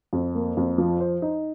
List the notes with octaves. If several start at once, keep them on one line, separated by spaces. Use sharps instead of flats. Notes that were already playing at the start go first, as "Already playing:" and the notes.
F2
A#3
F2
F3
C5
D#4